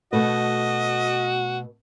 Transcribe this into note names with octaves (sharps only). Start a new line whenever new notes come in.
B2 A3 F#4 B4 D#5